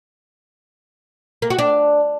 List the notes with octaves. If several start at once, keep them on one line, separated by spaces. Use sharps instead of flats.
A#3
F#4
D4